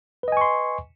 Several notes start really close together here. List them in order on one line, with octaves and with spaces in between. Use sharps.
B4 D#5 G#5 C#6 C6